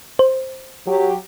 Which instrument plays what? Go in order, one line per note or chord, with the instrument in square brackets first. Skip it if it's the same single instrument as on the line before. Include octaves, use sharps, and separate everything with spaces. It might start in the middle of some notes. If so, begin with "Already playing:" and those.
[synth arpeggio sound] C5
[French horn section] F#3 G4